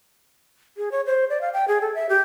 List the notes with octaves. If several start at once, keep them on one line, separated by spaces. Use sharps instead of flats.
G#4
C#5
C5
D5
F5
G5
G#4
A4
E5
G4